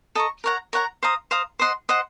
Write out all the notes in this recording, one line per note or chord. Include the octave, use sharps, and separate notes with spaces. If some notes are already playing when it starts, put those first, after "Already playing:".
A4 D#5 A#5 C#6
A#4 C#5 F#5 A#5
A#4 C#5 F#5 A#5
C5 F5 A#5 D#6
C5 F5 A#5 D#6
C5 D#5 F#5 C6
C5 D#5 F#5 C6